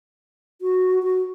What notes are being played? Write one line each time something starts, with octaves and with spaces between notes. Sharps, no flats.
F#4
F#4